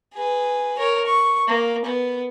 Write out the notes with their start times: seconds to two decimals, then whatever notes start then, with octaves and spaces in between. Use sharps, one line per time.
0.14 G#4 B4
0.78 A#4 C#5
1.06 C#6
1.47 A#3
1.85 B3